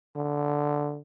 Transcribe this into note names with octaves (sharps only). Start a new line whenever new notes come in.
D3